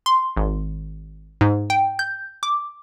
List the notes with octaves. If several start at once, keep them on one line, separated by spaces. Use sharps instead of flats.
C6
G#1
G#2
G5
G6
D6